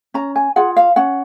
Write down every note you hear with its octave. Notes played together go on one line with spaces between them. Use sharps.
C#4 A#5
G#5
F4 G#4 F#5
F5
C#4 F#5